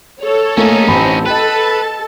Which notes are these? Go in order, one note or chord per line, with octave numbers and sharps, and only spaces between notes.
A4 C#5
A3 A#3 C#4 D#4
A1 C4 A5 B5
A4 B4 D#5 G5 A5